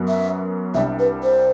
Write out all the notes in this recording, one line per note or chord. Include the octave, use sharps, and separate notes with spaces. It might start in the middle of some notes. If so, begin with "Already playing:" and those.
Already playing: F#2 F#3 B3
E5
C2 C3 G3 D4 E5
B4
C5